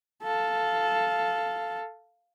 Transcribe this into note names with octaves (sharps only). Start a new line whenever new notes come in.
A4 F5